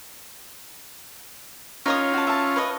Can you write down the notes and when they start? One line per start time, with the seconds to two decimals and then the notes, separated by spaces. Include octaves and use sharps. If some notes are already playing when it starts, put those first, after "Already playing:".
1.86 C#4 D#4 F4 C#5 D#6
2.14 F#4 A5
2.27 E5 A5
2.56 B4 C#5 D#5